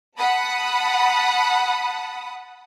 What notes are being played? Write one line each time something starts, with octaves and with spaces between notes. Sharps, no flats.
F#5 A5 B5 D#6